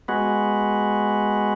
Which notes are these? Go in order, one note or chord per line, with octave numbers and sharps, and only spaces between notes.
G#3 B3 F#4